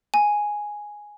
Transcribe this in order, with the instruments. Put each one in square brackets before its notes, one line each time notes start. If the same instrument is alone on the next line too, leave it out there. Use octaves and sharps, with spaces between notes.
[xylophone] G#5